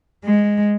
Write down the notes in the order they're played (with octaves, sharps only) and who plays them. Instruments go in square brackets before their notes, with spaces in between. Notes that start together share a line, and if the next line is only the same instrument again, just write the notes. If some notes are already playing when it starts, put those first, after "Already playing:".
[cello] G#3